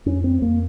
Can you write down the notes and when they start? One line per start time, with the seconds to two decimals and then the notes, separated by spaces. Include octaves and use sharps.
0.06 F2 C#4
0.24 C4
0.42 F2 A#3